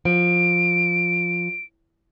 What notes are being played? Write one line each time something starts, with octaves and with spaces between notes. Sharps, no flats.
F3 D7